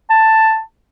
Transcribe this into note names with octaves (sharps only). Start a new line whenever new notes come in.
A5